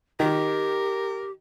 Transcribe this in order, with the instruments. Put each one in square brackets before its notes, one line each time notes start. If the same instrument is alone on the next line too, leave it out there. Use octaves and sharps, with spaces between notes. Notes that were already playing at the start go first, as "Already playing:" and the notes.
[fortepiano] D#3 [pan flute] G4 [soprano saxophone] A#4